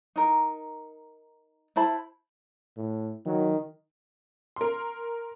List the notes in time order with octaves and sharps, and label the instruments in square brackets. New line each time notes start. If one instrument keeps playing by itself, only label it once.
[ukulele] D#4 A#4
E4 C5 A5 B5
[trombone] A2
[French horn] D#3 [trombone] F#3
[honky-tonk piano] A#4 C6